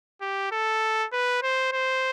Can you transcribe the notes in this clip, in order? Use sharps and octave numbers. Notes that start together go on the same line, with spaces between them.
G4
A4
B4
C5
C5